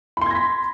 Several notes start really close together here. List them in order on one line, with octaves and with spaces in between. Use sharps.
B5 C6 G#6 A#6 B6